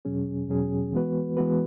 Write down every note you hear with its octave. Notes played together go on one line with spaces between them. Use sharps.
E2 B2 F#3 C#4 G#4
E2 B2 F#3 C#4 G#4
E3 G#3 B3 F#4 B4
E3 G#3 B3 F#4 B4